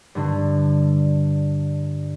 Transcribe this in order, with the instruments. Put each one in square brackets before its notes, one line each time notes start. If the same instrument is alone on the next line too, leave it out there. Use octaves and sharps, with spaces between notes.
[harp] G2 D3